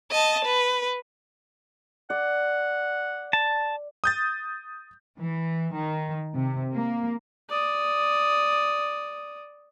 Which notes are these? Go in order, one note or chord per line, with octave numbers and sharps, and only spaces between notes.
D#5 A5
B4
D5 F#5
A5
D#6 G6 A6
E3
D#3
C3
A#3
D5 D#6